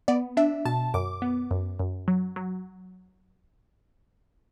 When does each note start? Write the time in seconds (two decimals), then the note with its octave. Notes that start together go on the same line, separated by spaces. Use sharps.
0.08 B3 D5
0.37 D4 E5
0.65 B2 A5
0.94 F#2 D6
1.22 B3
1.51 F#2
1.79 F#2
2.08 F#3
2.36 F#3